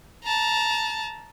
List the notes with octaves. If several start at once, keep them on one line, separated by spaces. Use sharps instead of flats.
A5 A#5